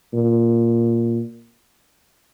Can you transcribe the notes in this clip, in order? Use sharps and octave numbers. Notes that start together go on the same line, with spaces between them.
A#2